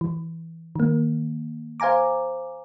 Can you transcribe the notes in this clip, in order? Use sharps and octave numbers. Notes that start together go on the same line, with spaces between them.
E3
D#3 A#3
C5 F5 G#5 A#5 D6